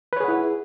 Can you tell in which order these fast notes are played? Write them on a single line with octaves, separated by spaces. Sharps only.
B4 C#5 G#4 F#5 E4